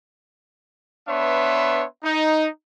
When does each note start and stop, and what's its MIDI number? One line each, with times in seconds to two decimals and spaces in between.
1.08 1.84 59
1.08 1.84 62
1.08 1.84 71
1.08 1.84 73
1.08 1.84 76
1.08 1.84 84
2.04 2.47 63